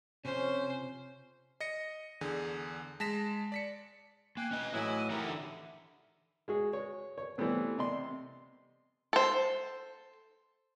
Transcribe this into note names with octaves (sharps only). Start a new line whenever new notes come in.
F2 C3 C#4 C5
D#5 A#6 C#7
E2 D3 G#4
G#3 A5 A#6 B6 E7
D5 B6 C#7
A#3 G5 G#5 F#6
B2 E3 C#4 D#5 G#5
A2 E3 F#3 E4 D#5 E5 G#5
D#7
E3 D#4 E4 G4 A#4 F#5 A#5
D3 E5
G#3 F#4 G#4
C#5
C#5
E3 G3 A3 B3 C4
C3 D5 D#5 C6
A4 C5